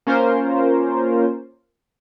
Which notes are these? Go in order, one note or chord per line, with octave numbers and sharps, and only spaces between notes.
A#3 C#4 F4 A#4 C5